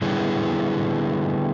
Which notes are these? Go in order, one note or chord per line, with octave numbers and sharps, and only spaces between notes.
D3 G3 B3 E4 G#4